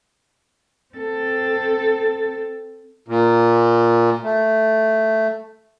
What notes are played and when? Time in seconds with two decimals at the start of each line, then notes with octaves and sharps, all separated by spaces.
0.95 C4 A4
3.08 A#2
4.24 A3